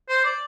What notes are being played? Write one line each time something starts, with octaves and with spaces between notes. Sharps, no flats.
C5
D5